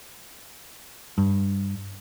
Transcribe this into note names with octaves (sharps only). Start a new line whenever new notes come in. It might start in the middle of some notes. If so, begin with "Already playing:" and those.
G2